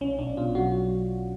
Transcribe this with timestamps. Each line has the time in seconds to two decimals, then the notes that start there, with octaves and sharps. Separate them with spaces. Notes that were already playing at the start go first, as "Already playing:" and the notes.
0.01 B1 C#4
0.19 B1 D4
0.37 B2 F4
0.55 F#3 F#4